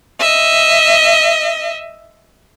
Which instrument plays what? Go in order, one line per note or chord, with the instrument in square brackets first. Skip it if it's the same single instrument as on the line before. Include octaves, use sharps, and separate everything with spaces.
[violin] D#5 E5